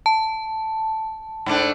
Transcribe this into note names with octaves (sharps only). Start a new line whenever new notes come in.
A5
G#2 A3 D4